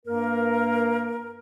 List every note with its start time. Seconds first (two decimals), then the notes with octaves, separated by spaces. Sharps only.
0.06 G2 A#3 A#4